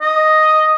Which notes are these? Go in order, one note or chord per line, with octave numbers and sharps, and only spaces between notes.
D#5